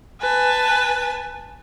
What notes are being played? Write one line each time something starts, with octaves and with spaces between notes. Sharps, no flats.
B4 G#5 A5